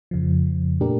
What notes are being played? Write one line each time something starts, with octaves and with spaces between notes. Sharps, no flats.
F2 C#3 F3
A#2 A3 D4 G4 A#4